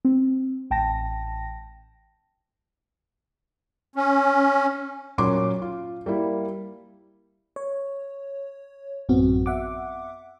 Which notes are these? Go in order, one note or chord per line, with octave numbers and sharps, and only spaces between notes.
C4
A1 G5 A5 A#6
C#4
A#2 F#3 C#4 C6 D6
F4
G3 A#3 E4
C#5
A1 F#2 B3 C4 F#4
E5 F#5 D6